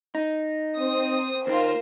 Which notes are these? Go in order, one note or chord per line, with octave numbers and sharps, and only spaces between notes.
D#4
C4 D#6
D#2 D#3 F4 A#4 C5